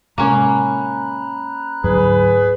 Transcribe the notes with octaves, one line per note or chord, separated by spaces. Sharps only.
A2 C3 G#3 A#3 C#4 A#5 B5 F#6
D2 G#2 F#3 G#4 B4